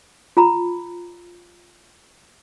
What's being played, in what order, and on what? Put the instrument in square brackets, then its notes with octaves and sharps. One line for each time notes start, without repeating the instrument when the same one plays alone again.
[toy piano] F4 A#5 B5